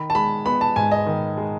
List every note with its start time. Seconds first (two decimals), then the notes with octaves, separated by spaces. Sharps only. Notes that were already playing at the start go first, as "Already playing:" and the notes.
Already playing: D#3 B5
0.10 A5
0.15 G#3 B5
0.45 B3 B5
0.61 A5
0.76 G#2 G#5
0.92 D#5
1.06 D#3
1.37 G#3